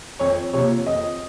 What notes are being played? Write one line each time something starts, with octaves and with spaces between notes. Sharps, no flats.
F2 C#5
C3 F3 A#3 C#5
F2 D#5